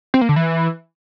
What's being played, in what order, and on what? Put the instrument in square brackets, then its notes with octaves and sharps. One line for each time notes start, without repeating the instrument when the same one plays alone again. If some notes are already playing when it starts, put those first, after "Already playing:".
[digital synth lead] C4
A#3
D3
E3